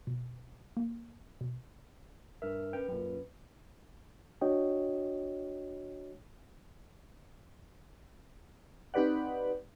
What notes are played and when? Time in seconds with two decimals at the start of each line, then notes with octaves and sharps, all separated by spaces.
0.07 B2
0.77 A#3
1.41 B2
2.42 G2 A#4 E5 F6
2.73 C#4 B4 G5
2.88 F#2 A#2
4.41 D4 F#4 C#5 D#5 G5
8.94 C4 D#4 G4 B4 D5 F#5